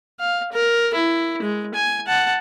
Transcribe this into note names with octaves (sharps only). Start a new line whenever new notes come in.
F5
A#4
E4
G#3
G#5
F#5 A5